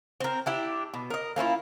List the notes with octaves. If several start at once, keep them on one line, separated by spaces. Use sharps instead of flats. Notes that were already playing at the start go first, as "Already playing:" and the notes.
C4 A#4
D4 E4 G4
B2
A#4 D#5
A#3 C#4 E4 F4